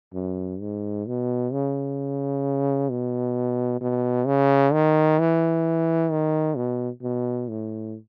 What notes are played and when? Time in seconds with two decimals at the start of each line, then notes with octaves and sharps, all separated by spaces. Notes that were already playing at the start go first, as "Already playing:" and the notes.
0.14 F#2
0.60 G#2
1.07 B2
1.53 C#3
2.90 B2
3.81 B2
4.27 C#3
4.73 D#3
5.19 E3
6.11 D#3
6.56 B2
7.02 B2
7.49 A2